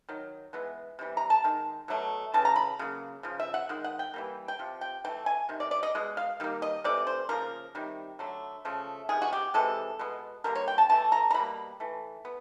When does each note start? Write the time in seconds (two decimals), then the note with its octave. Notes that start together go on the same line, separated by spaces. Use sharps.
0.09 D#3 F#3
0.53 E3 G#3 B3
0.99 C3 E3 G3
1.17 A#5
1.30 A5
1.44 D#3 G#3
1.88 B2 F#3 A3
2.34 C#3 E3 A5
2.45 A#5
2.56 B5
2.79 C#3 F#3 A#3
3.23 C#3 F3
3.40 E5
3.54 F#5
3.69 D#3 G#3
3.84 F#5
3.99 G5
4.14 E3 G3 A#3
4.48 G5
4.59 C3 F3
4.81 G5
5.04 E3 G5
5.08 A3
5.26 G#5
5.49 C3 D#3
5.60 D5
5.71 D5
5.83 D#5
5.95 B2 G#3
6.17 F5
6.40 D#3 G3 A#3
6.62 D#5
6.84 C3 E3 A3 D5
7.07 C5
7.29 C#3 F3 A#3 A#4
7.75 C3 D#3 G3
8.19 D3 F#3 A3
8.65 C#3 F3 A3
9.09 C3 D#3 G#4
9.22 F#4
9.33 G4
9.54 C3 E3 G#3 A4
9.99 B2 G#3 B3
10.44 D3 G3 A#3 A#4
10.55 C#5
10.68 G5
10.78 A5
10.90 E3 A3 A5
11.12 A#5
11.31 A#5
11.34 B2 G3 A#3 B5
11.80 E3 A3
12.25 B3